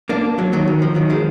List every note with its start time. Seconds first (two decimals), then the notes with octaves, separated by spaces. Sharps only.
0.09 A#3 D4
0.38 F#3 A#3
0.53 D#3 F#3
0.68 D#3
0.82 F3
0.95 D#3 F#3
1.10 F3 G#3